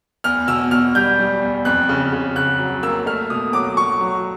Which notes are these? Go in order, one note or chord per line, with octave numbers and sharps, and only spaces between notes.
E2 F6
B2 E6
B2 F6
G3 G6
G3
E2
F2 F#6
C#3
C#3
C#3 F#6
F#3
A#3 E6
A3 F6
B2 D#6
F#3 D6
F#3 C#6
F#3